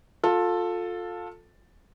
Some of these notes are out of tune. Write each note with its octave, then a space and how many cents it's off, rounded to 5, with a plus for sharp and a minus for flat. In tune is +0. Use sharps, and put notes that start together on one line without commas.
F4 +25 A4 +5